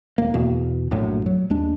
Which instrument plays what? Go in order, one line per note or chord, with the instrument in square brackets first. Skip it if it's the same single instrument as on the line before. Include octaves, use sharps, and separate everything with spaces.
[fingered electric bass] D#1 A#3
E2 B2
A#1 F#2 A2 F#3
F#3
D#2 G#3 D4